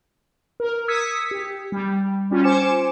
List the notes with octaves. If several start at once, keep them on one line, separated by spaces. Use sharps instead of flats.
A#4
D#6 E6 G#6 B6 C#7
G4
G3
G3 C#4 F4
C5 G#5 D6 C#7 E7